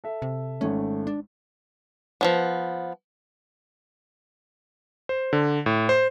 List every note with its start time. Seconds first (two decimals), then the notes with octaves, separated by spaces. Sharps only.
0.04 A4 E5
0.22 C3
0.61 G#1 A3 C#4
1.07 D4
2.21 F3 F#3 B3
5.09 C5
5.33 D3
5.66 A2
5.89 C5